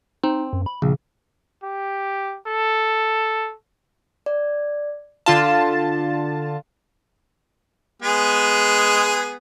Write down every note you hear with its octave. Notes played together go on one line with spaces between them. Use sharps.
C4 D#4
F#2
B5
A#1 C#3
G4
A4
D5
D3 F4 F5 A5
G#3 B3 G#4